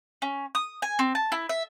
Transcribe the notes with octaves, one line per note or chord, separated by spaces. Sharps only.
C#4
D#6
G#5
C4
A5
E4
E5